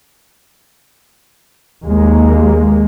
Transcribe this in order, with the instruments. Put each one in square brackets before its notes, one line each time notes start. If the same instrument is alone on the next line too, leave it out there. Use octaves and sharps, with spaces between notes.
[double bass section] D#2 G#3 A#3